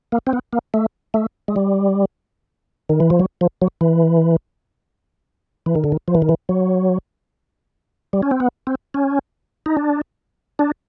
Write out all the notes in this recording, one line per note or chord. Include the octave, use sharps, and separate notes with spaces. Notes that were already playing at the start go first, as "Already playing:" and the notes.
A#3
C4
B3
A#3
A3
A3
G#3
G3
D#3
E3
F3
F#3
F3
F#3
E3
E3
D#3
D3
D#3
F3
E3
D#3
E3
F#3
G3
C#4
C4
B3
C4
C#4
D#4
D4
D4